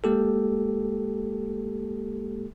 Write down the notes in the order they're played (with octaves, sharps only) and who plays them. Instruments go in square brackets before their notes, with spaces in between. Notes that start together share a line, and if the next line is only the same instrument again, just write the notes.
[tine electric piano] G#3 A#3 G4 A4